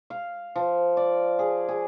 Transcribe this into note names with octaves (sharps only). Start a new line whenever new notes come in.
F5
F3
D5
G#4
G#4